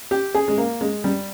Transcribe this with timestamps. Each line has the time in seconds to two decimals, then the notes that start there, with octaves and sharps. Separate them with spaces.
0.11 G4
0.35 G#4
0.48 G#3
0.58 A#3
0.81 G#3
1.04 G3